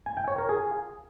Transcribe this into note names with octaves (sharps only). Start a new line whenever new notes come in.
G#5
G5
C#5
A#4
G#4